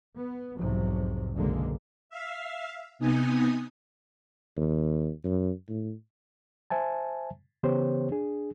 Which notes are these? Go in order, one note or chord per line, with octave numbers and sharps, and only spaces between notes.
B3
B1 E2 G#2 C3 F3 F#3
F#1 B1 D3 G#3 A#3
E5 F5
C3 B3 D#4 G#5 D#6
D#2
F#2
A2
C5 E5 G#5 A5
C#3 E3 B3 G4 C5 C#5
D4 G#4